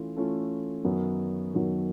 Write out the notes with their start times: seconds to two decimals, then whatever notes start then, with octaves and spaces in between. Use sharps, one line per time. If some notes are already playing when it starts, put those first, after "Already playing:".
Already playing: E3 A3 C#4 F4
0.16 E3 A3 C#4 F4 A4
0.85 F#2 D#3 F#3 B3
1.54 F#2 D#3 F#3 B3